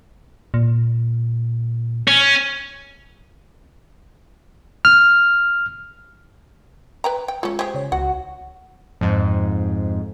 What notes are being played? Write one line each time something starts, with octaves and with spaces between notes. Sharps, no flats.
A#2
C#4
F6
B4 G5 A#5
G5
G#3 A3 C#4 F4
G4 G#4 C5
C#3 C#5
C#2 F#4 F#5
F2 G#2